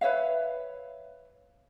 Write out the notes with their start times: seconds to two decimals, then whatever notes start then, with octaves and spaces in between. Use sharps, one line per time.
0.01 B4 C#5 E5 F5